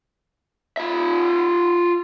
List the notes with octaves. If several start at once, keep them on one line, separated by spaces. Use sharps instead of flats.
F4 E5